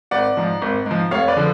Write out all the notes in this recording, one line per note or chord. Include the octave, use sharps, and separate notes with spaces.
G#1 D5 F#5
G#2 F3
G#1
G#2 F3
F1 C#5 F5
B4 D5
D3 F3